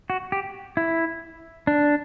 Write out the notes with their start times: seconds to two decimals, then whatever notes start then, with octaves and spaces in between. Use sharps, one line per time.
0.10 F#4
0.32 G4
0.77 E4
1.67 D4